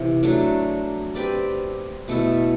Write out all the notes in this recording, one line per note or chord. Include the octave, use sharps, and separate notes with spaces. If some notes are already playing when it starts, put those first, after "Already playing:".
Already playing: C3 E3
F#3 A3 D4 F#4
C4 G4 B4 D5
B2 A3 E4 A4